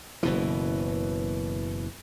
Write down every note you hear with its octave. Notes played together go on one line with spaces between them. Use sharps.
F#1 B2 E3